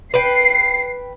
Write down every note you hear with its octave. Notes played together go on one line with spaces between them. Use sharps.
B4 G5 C7